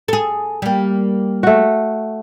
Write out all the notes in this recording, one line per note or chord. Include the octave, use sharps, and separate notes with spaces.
G#4 A4
G3 A#3
A3 F#4